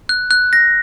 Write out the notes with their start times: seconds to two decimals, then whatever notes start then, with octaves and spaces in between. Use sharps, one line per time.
0.09 F#6
0.31 F#6
0.53 A#6